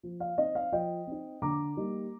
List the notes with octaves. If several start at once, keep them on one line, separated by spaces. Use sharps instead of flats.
F3
F5
C4 D#4 D#5
F5
F3 D#5 G5
C4 D#4
D3 A#5 D6
G3 A#3 D#4